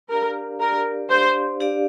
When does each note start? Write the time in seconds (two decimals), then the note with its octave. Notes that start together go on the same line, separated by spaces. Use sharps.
0.10 D4 G4 A#4 D5 F5
0.61 D4 G4 A#4 D5 F5
1.10 D4 G4 C5 D5 F5
1.60 D4 G4 D5 F5